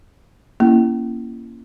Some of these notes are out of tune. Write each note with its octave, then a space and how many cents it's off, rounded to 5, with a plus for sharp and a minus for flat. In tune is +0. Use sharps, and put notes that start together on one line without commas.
A#3 +0 C#4 -5 E4 +25